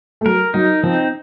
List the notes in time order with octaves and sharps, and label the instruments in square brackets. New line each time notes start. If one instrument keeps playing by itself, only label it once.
[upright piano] A3
[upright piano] F#3 [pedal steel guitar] A#4
[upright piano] F#3 [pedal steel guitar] D#4
[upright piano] F3 [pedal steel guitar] C4